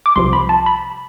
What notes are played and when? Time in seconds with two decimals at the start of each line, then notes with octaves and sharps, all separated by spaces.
0.06 D6
0.16 C2 C3 F3 C6
0.33 B5
0.49 A5
0.66 B5